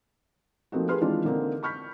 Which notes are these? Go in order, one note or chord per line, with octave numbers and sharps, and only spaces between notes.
F3 A3 A#3 C4 D#4 F#4
G4 G#4 A#4 B4 C6 F6
D#3 E3 G#3 C4 D4 F4
D3 A#3 C4 D#4
B5 C#6 F6 G6 B6